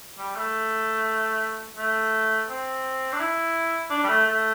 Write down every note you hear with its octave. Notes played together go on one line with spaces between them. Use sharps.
G3
A3
A3
C4
D4
E4
D4
G3
A3
A3